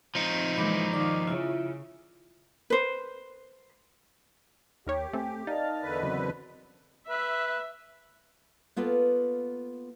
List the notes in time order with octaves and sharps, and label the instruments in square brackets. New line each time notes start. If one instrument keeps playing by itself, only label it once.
[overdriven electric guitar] F3 D#4 [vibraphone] C4
[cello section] A#2 E3 G#3 [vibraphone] B5 D6
[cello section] D#3 F5 [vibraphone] D5 D6
[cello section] C#3 [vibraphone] E4 F4 E5
[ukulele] B4 C5
[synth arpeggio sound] D#2 A#4 C#5 [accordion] G4 [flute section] G5
[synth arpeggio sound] A3 C4 [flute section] G5 G#5
[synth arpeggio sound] D#4 [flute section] A#4 D5 D#5 [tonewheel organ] F5 A5
[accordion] E2 D3 B4
[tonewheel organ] C#3 F#3 C4
[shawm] B4 [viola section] E5
[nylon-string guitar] A#3 B3 F4 A4 B4